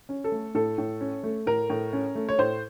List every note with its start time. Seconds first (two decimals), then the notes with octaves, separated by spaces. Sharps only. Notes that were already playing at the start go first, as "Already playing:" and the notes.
0.09 C#4
0.24 A4
0.32 A3
0.55 A2 A4
0.78 A2
1.01 C#4
1.23 A3
1.47 A2 A#4
1.70 A2
1.93 C#4
2.15 A3
2.29 C#5
2.38 A2 C5